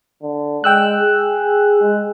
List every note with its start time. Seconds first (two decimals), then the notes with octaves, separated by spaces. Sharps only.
0.23 D3
0.64 G#3 G5 E6 F#6
1.01 G#4
1.81 G#3